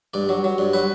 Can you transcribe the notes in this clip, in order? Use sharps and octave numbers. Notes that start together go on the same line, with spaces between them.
G2 D5
F#3
F#3
G2
F#3 B4